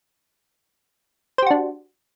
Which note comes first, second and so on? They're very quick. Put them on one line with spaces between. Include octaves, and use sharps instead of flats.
C5 G4 F#4 D4